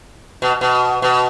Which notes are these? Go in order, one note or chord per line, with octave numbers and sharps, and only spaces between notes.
B2
B2
B2